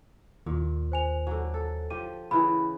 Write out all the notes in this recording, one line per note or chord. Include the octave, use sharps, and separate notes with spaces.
D#2 A#2
C5 G#5 F7
D3 F#3
A4
F3 G4 D#7
C#3 E3 E4 B5